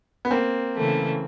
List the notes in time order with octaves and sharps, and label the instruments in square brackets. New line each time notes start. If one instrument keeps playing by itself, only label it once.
[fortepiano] B3
A#3 C4
[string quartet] C#3 E3 A3